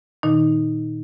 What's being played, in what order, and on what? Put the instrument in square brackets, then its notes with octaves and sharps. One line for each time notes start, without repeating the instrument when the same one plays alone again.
[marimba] A#2 D#3 D#4